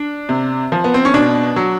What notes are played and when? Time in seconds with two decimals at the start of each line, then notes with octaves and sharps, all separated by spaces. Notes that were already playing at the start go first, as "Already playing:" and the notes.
Already playing: D4
0.29 C3
0.72 F3
0.84 B3
0.94 C4
1.05 C#4
1.14 B2 D4
1.56 F#3